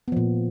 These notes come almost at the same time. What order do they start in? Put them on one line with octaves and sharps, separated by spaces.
B3 F3 A#2